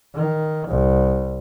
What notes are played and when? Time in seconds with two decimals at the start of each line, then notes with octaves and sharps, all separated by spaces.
0.15 D#3
0.69 C2